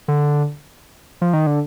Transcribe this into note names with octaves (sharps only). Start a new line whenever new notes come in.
D3
F3
D#3
D3